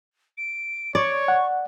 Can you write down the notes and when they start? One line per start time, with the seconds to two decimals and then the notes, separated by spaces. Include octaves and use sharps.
0.38 D7
0.95 C#5 D5 C#6
1.28 F#5